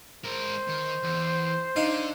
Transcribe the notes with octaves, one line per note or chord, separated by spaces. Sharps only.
G#3 A#4 C5
D#3
E2
D3 D#4 F5